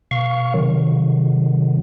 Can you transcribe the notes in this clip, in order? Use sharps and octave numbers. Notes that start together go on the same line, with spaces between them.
B2 F5 C#6
C3 D#3 F#3